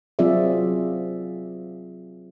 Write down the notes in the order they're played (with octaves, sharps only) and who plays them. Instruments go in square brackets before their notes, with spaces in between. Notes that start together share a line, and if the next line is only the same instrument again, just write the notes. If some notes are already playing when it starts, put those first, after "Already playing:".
[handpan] F#3 C4 F4 G#4 D5 E5